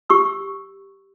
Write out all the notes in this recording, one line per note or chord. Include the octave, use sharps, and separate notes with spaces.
G4 C#6 E6